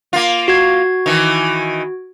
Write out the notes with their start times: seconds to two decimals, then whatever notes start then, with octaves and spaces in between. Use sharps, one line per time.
0.13 A#3 F4
0.48 F#4 G#6
1.06 D#3 E3